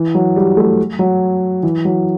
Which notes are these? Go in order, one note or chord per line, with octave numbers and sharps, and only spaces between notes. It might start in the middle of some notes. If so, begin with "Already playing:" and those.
Already playing: E3
F#3
G3
A3
F#3
E3
F#3